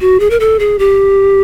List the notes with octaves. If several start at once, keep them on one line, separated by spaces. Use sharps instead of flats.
F#4
G#4
A#4
A4
G#4
G4